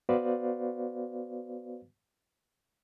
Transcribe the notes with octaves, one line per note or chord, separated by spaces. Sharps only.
B3 F#4 B4 C5 D5 F5